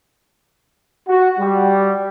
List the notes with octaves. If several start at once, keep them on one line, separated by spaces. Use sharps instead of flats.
F#4
G3